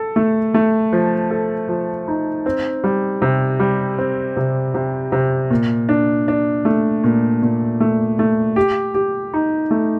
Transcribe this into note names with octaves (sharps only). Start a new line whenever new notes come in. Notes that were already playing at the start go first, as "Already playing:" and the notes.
Already playing: A4
A3
A3
F3
A4
F3
D#4
C4
G3
C3
G3
C4
C3
C3
C3
A#2
D4
D4
A3
A#2
A#2
A3
A3
G4
G4
D#4
A3